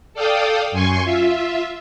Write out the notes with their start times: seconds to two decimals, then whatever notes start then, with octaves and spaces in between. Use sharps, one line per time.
0.14 A4 D5 F5 G5 D#6
0.72 F#2 G#5 C6 C#6
1.04 F4 E5